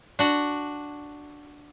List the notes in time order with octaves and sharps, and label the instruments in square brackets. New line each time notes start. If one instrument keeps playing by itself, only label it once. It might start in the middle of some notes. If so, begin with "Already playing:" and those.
[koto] D4 F#4